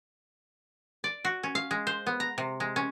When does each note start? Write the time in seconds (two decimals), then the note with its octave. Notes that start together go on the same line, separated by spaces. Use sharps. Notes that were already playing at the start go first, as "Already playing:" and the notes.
1.04 D5
1.25 F#4
1.43 C#4
1.55 F5
1.71 G#3
1.87 C5
2.07 B3
2.20 A#5
2.38 C3
2.60 G#3
2.76 C#4